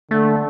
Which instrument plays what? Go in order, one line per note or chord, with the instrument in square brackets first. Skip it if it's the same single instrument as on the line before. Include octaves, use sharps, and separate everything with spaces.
[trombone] D3 [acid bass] A3